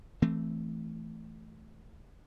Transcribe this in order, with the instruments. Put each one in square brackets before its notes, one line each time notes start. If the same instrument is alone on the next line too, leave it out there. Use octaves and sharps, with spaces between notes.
[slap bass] E3 A3 C4